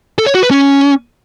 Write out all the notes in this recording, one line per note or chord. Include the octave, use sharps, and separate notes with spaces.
A4
C#5
F#4
B4
C#4